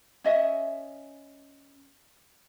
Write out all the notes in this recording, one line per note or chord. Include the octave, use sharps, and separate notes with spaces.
C#4 D#5 E5